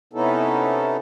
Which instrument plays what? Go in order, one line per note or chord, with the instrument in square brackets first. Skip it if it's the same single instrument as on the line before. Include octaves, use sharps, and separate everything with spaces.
[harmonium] C3 B3 C#4 D#4 E4 A4